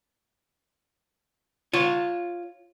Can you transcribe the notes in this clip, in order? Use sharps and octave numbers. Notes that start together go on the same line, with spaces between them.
F4 C#5